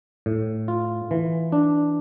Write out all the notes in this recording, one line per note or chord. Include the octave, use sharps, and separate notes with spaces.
A2
F4
E3
D4